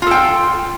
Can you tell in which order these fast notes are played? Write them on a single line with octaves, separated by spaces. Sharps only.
F4 A4 G5